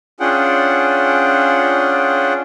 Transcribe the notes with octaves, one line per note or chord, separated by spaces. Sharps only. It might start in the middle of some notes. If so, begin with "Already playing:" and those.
C#4 D4 F4 G#4 F#5 G5